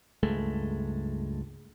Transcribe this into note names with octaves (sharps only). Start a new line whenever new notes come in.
C#2 G2 G#3 A3